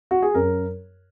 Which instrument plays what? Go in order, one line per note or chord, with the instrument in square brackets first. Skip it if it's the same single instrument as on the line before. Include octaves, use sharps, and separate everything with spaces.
[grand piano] F#4
G#4
F#2 A#4